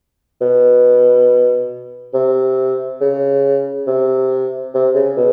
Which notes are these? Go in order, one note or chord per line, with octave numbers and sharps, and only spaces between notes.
B2
C3
C#3
C3
C3
C#3
B2